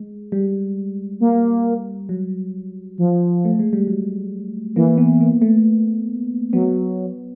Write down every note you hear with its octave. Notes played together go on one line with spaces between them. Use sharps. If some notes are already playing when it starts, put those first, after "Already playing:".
Already playing: G#3
G3
A#3
F#3
F3
A3
G#3
G3
F#3
E3 A#3
B3
A#3
A3
F#3 B3